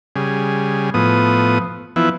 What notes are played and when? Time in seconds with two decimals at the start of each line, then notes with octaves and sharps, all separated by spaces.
0.16 C#3 G3 G#4
0.94 A2 F3 B3 D#6
1.96 E3 F3 B3 E4